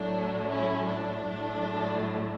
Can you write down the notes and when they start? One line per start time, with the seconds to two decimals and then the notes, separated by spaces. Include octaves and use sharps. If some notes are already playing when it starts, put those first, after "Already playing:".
Already playing: A2 F#3 A3 D4
0.48 C#4 E4
0.86 D4
1.24 A2 F#3 A3